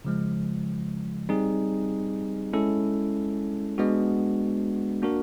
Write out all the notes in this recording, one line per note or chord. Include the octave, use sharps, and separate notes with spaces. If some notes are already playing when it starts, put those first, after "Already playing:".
C#3 F3 G#3
G3 C4 D#4 G#4
G#3 C#4 E4 A4
G#3 B3 D4 F#4
A#3 D4 F#4 A#4